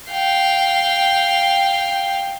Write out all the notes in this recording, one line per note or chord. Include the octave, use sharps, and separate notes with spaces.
F5 G5